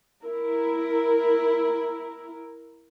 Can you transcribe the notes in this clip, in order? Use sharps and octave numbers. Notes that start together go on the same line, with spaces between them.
E4 A#4